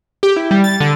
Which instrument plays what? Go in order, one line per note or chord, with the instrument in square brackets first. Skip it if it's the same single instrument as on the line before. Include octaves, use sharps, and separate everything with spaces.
[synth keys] G4
E4
G3
A6
D3